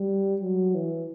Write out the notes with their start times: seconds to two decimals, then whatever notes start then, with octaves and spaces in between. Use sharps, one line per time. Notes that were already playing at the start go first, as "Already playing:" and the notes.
Already playing: G3
0.42 F#3
0.75 E3